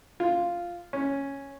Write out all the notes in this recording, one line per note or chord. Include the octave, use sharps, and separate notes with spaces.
F4
C#4